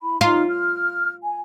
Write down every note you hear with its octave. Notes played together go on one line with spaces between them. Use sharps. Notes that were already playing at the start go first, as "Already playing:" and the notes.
E4 B5
D#4 F4 A#5 F6
F6
G#5